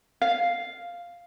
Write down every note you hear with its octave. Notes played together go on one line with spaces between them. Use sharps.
F5